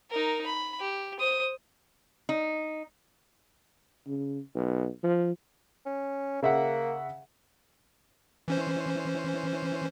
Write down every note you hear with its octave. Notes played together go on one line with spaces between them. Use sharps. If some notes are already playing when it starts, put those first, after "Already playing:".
D#4 A#4
B5
G4
C5 D#6
D#4
C#3
B1
F3
C#4
C#3 A#3 E5 F#5
E3 C#4 C5